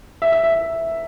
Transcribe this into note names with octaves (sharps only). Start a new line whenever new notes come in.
E5
E5
E5